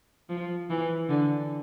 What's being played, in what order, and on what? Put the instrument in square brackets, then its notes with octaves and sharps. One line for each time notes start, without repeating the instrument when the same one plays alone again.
[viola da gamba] F3
E3
D3